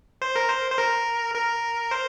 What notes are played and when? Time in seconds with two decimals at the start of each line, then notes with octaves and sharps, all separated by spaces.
0.22 C5
0.35 A#4
0.50 C5
0.71 C5
0.78 A#4
1.34 A#4
1.91 C5